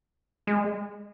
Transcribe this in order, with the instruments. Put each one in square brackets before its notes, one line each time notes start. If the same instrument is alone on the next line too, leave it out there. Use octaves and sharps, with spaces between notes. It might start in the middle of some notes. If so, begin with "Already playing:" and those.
[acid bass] G#3